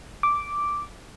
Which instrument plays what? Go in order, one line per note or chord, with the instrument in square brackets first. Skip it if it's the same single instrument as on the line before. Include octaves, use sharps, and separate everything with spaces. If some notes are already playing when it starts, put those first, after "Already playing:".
[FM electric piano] D6